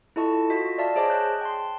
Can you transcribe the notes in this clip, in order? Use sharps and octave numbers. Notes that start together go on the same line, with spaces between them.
E4 F4 A4 D#5 A5 C#6
F4 F#4 D#5 B6
D5 E5 F5 A5
G#4 C5 C#5 D#5 A5 D6
F#6 G6
G5 A5 C6